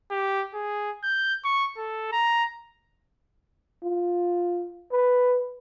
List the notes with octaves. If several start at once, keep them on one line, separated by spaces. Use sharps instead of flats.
G4
G#4
G6
C#6
A4
A#5
F4
B4